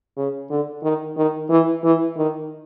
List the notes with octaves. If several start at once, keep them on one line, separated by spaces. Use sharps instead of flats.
C#3
D3
D#3
D#3
E3
E3
D#3